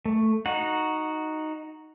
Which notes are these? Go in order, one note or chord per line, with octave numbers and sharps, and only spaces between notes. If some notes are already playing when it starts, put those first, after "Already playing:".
A3
D#4 F#4 F#5